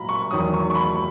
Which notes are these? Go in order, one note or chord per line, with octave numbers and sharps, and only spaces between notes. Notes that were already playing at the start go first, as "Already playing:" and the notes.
Already playing: A#2 F#3 A#5 B5
C#6
E2 D#3 F#3 D#6
C#6
C#6
B5